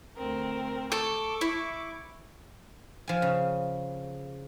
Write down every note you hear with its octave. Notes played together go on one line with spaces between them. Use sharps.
D2 C4 A#4
A4 C#6 D6
E4
F3 G#5
C#3